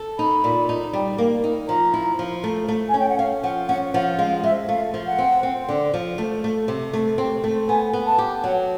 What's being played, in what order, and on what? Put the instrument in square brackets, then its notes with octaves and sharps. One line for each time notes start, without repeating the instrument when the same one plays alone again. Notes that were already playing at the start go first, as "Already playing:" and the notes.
Already playing: [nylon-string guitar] A4
[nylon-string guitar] D#4 [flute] B5
[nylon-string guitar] A#2
D#4
G3
A#3
D#4
[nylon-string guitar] F3 [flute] A#5
[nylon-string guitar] E4
F3
A3
A3
[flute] G#5
[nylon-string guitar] C#4
[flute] G5
F#5
[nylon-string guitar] C#4 [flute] F5
[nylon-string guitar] F3 [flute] F#5
[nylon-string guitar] C#4 [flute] F#5
[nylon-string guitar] F3 [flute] F#5
[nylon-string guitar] G#3 [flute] F5
[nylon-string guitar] G#3 [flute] E5
[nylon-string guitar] A3 [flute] F5
[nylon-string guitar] F3
[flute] F#5
[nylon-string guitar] C4
C4
D3
F3
A3
A3
C3
A3
C4
A3
[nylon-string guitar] B3 [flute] G#5
[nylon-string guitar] B3
[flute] A5
[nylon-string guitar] G4
[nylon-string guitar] F#3 [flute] F#5